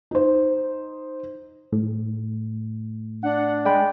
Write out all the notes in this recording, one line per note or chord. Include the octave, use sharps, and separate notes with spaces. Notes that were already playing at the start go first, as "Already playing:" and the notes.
D#4 C5
A2
D4 F#5
G#3 D5 G5 B5